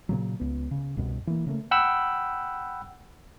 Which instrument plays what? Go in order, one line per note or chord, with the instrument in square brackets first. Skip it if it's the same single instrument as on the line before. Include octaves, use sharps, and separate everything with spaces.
[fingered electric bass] A#2 C#3 F#3
C#2 B3
C#3
C2 F#2 B2
E3 A#3
C#3 A3 A#3
[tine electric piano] F#5 G5 B5 E6